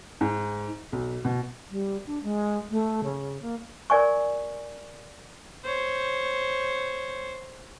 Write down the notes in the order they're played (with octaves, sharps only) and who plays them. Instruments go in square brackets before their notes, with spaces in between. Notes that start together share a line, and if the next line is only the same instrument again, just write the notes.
[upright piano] G#2
B1
B2
[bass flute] G3
D4
G#3
A3
C#3
A#3
[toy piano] A#4 D5 G#5 C#6
[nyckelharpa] C5 C#5